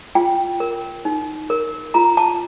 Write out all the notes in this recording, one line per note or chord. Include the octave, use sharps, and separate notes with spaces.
F4 G5
A#4
D#4
A#4
F4 A#5
A5